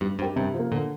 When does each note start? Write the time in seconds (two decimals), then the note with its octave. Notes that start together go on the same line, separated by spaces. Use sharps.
0.01 G2 G3
0.19 G2 C4 G4 A#4
0.36 G2 C3
0.54 F3
0.59 A#3
0.71 A#2 D3